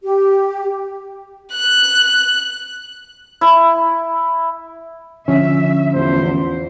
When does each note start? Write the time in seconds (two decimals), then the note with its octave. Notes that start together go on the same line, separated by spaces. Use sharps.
0.04 G4
1.54 F#6
3.41 E4
5.28 D3 F3 C#4 E5
5.93 A1 E2 F4 C5